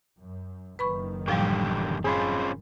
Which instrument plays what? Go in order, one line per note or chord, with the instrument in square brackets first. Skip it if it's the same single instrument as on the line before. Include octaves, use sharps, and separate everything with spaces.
[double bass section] F#2
[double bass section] F#1 F#2 D#3 [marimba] B4 B5 C#6
[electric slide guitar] E2 D3 G4 [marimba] A2 F3 G3
[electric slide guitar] C4 C#4 F4 [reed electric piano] G#4 B5 C6